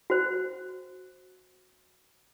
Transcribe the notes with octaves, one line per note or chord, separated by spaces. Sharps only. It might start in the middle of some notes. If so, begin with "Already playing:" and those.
F#4 C5